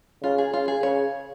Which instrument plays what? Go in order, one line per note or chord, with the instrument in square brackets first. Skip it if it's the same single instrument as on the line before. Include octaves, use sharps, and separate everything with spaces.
[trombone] C#3 [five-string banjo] F4
[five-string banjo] G#4
[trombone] C#3 [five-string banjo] F4
[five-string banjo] G#4
[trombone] C#3 [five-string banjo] C#5